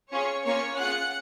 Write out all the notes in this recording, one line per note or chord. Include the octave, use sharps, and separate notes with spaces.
C#4 F4 G#4 C#5 C#6
A#3 C#4 F4 C#5 C#6
C#4 F4 G#4 F#5 F#6